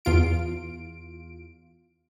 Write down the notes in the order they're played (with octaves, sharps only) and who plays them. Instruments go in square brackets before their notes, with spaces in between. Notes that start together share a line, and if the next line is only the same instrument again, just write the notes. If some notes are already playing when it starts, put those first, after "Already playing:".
[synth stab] E2 F4 D7